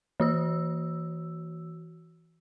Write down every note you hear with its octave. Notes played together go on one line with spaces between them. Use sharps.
E3 F#4 E6